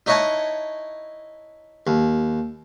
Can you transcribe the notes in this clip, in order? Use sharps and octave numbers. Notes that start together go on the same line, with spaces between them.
D#4 E4 C#5 D#5 F#5 A5
D#2